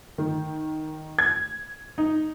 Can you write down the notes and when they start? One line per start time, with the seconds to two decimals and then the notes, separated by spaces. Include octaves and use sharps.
0.18 D#3
1.19 G#6
1.98 D#4